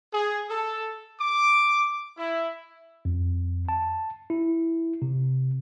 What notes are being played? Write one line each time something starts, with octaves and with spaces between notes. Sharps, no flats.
G#4
A4
D6
E4
F2
A5
E4
C3